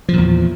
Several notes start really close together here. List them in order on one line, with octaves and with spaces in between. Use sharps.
F3 A#2 E2